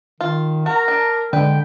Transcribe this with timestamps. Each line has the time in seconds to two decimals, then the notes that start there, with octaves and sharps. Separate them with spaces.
0.21 D#3 F4
0.66 F#4 A#4 A#5
0.88 D4
1.33 D3 G#3 B4 G5